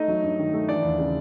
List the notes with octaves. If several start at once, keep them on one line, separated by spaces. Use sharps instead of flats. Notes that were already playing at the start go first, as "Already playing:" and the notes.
Already playing: A3 D#4 D#5
F#3
G2
D#3
A3
E3 D4 D5
D#2
C#3